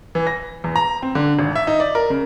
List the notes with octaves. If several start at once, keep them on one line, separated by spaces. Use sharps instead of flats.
E3
A#6
E2
A#5
C4
D3
G#1
E5
D#4
D5
A#4
C#3